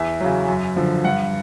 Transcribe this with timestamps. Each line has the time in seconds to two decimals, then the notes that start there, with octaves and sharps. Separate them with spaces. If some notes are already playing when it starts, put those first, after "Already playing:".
Already playing: E2 E5
0.20 C#3 F#3
0.48 F#2
0.76 D3 F3
1.04 G2 F#5